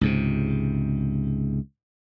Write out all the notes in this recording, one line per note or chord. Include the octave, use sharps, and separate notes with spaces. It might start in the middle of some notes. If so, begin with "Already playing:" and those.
C#2 G#2 C3